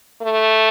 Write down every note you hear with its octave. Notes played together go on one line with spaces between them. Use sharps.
A3